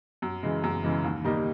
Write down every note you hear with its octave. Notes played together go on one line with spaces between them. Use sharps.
F#2
C#3 E3 G#3
F#2
C#3 E3 G#3
D#2
D#3 G3 A#3 D#4